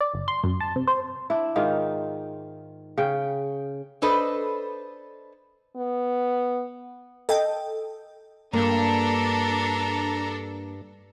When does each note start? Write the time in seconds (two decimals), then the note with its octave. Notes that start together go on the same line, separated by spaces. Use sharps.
0.01 D5
0.14 G1
0.28 C6
0.44 F#2
0.61 A5
0.76 C3
0.87 C5
1.30 D4 E4
1.56 G#2 D#3 D#4 F4
2.98 C#3 G5
4.02 D4 A4 B4 C5 D#5
5.76 B3
7.29 A4 D#5 G5
8.53 G2 A#3 D4 A4 A#5